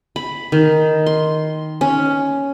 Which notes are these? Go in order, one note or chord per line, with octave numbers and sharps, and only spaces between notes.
B5
D#3
C6
C#4